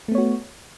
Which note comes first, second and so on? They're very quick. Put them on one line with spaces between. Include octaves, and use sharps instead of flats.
A3 B3 C#5 F#4